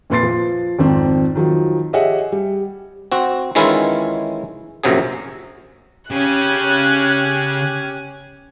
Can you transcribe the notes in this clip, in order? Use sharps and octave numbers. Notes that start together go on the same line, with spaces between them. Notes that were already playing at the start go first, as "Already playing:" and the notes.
F2 A#2 B4 C6 A6 C7
F3
G#1 F2 C4
D#3 F3 F#3
G4 G#4 C#5 D#5 E5 F#5
G3
C4 F#4
D#3 E3 G#3 C#4 E4 F4
A#1 F#2 C3 F#3 G#4
C#3 C#4 G4 G#5 F#6